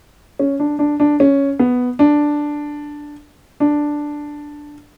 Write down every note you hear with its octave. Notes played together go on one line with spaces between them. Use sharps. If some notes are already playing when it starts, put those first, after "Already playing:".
C#4
D4
D4
D4
C#4
B3
D4
D4